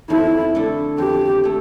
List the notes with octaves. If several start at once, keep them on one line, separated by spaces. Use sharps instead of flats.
F2 E4
D3 A3 E4
F2 G4
A3 E4